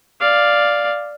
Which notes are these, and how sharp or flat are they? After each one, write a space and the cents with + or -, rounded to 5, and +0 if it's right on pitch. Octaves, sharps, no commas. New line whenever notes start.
D5 +0 F5 +0